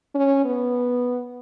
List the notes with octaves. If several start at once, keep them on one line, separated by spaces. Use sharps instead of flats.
C#4
B3